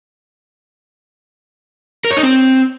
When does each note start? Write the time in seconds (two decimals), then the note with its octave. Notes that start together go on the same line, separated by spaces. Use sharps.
2.05 A#4
2.11 C#5
2.17 D#4
2.23 C4